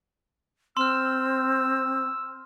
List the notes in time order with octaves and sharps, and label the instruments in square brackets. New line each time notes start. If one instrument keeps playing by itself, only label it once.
[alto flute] C4 [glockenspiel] C6 F6 [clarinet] E6